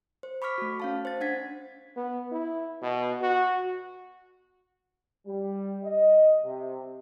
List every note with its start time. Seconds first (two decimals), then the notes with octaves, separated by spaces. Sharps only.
0.23 C5
0.42 B5 C#6 D6 F6 B6
0.58 A3 F#4
0.80 C#4 F5 A5
1.05 C5 A6
1.21 D4 F#5 G#6 B6
1.97 B3
2.32 E4
2.82 B2
3.22 F#4
5.27 G3
5.84 D#5
6.45 C3